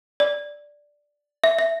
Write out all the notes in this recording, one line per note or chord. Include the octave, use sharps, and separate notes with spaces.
D5
E5
E5